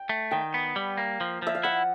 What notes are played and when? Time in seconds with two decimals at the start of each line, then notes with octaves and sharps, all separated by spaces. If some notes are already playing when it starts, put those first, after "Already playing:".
Already playing: G5
0.09 A3
0.31 D#3 G5
0.54 B3
0.76 G3
0.98 A#3
1.21 F3
1.42 F3 E5
1.55 F5
1.63 E4 F#5